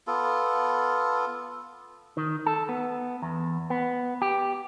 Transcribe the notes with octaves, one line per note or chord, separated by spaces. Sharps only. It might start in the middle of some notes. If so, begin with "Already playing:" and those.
B3 F4 A4
D#3
A4
B3
E2
B3
G4